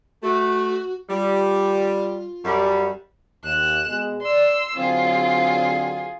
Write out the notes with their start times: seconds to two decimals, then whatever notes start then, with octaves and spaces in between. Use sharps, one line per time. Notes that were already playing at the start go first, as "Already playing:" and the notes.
0.23 A3 F#4
1.09 G3 F4
2.45 F#2 G3
3.44 D#2 F#6 E7
3.87 B2 G#3 G#4
4.22 D5 C6 E6
4.77 D3 F#3 C4 F4 G#4